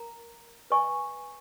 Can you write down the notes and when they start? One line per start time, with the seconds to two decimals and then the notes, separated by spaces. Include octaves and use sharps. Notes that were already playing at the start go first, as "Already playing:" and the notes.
Already playing: A#4 A#5
0.70 B4 D#5 G#5 C#6